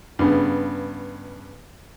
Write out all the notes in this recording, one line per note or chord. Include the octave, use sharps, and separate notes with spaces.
G2 C#3 B3